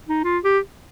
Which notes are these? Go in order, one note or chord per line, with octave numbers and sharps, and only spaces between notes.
D#4
F4
G4